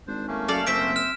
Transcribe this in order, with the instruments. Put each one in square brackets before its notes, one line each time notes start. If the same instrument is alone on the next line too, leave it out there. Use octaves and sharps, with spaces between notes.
[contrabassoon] G#1 [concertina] D4 C5
[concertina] A3 A#3 C#4
[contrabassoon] F#2 [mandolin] A4 D5 F5
[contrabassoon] F#1 [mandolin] C4 C5 E5 [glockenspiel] B6 D7
[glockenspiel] F6 E7